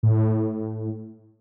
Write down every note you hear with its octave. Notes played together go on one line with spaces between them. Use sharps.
A2